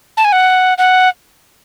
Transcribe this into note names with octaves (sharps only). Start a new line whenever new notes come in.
A5
G#5
F#5
F#5